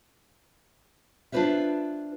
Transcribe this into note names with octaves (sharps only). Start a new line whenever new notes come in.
D4 F4 F#4 B4 C5 E5